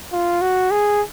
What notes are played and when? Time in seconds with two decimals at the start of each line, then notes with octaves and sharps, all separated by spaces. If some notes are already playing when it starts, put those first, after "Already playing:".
0.12 F4
0.41 F#4
0.71 G#4